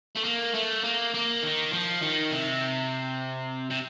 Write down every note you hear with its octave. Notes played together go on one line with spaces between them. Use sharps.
A3
A#3
A3
A#3
A#3
D#3
F3
D#3
C3
C3